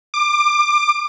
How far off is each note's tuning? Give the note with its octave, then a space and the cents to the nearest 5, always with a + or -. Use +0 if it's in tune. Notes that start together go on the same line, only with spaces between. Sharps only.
D6 +25